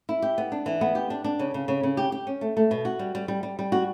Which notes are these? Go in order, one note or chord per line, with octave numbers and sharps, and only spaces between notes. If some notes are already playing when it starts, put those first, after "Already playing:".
E4
G4
B3
D4
E3
B3
G4
D4
D4
C#3
C#3
C#3
C#3
G4
G4
C#4
A3
A3
B2
F#4
G3
G3
G3
G3
G3
F#4